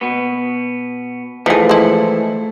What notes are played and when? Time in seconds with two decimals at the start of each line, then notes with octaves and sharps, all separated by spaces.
0.01 B2 B3
1.46 E3 F3 A3 D#4 G#4
1.69 G#3 E4